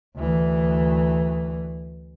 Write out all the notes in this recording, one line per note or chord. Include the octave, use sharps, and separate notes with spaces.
D2 E3